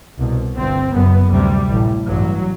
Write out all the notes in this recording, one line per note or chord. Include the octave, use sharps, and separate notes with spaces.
C2 B2
G1 G2 C4
F#1 F#2 B3
D2 C3 G3
A1 A2
A1 G2 F#3